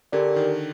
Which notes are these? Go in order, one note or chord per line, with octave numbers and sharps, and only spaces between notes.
D3 D4 G4 A#4 D5
D#3